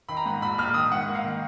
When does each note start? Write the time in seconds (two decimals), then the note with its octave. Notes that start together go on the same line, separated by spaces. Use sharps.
0.09 D#3 B5
0.17 A#5
0.26 G#2
0.42 A#1 B5
0.58 A#1 F6
0.74 D#3 D#6
0.91 G#2 F#5
1.08 A#3
1.15 F5
1.24 D#3